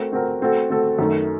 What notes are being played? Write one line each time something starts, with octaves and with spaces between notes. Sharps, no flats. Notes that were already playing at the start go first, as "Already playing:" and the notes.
Already playing: A3 C4 F#4 A#4
A3 C4 F#4 A#4
A3 C4 F#4 A4
A3 C4 F#4 A4
F#2 D#3 A3